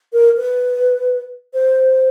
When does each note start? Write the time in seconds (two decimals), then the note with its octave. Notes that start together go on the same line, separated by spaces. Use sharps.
0.13 A#4
0.37 B4
1.54 C5